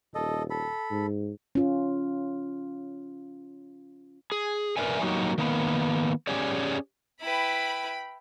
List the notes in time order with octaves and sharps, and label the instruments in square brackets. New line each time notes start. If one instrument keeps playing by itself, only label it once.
[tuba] D#1 [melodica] A4 D#5
[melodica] A4 B5
[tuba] G#2
[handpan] C#4 F4
[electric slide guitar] G#4
A#4 B4 D5 E5 G#5
F#3 A#3 D#4 F#4 G4
D#3 A#3 B3
C#4 G4 G#4 C#5 D5
[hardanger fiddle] E4 B4 [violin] G5 B5